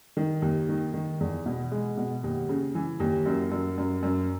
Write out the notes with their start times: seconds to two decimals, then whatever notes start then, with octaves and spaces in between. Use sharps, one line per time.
0.17 D#3
0.42 D#2
0.69 D#3
0.94 D#3
1.20 E2
1.46 B2
1.72 G#3
1.97 B2
2.24 D#2
2.49 C#3
2.75 E3
3.00 D#2
3.26 F#2
3.52 F#2
3.78 F#2
4.03 F#2